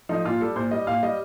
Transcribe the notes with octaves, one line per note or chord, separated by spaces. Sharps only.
F3 A3 D#4
A#2 F4
G3 A4
A#2 C5
G3 D#5
A#2 F5
G3 D#5